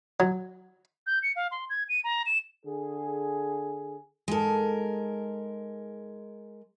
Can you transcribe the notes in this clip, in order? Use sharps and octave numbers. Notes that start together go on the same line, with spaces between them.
F#3
G6
C#7
F5
C6
G#6
D#7
A#5
E7
D3 G#4
G#2 G#3 A4 A#4